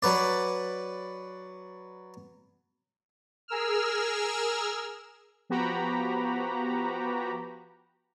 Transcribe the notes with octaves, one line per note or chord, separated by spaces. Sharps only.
F#3 B4 D5
G#4 A#4 E6 F6
F3 B3 F#4 G4 A#5 B5